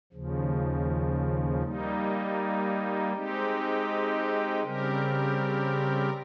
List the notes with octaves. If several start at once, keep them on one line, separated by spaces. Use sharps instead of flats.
D#2 C#3 F3
G3 A#3 D#4
G#3 C4 D#4 G4
C#3 G3 C4 G4 A#4